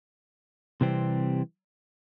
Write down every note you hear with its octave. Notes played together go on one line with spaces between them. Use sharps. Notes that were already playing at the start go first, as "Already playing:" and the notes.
C3 E3 G3 C4